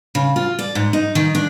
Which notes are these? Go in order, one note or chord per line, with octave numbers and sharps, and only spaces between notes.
C#3
F4
D5
G#2
D#4
D#3
D4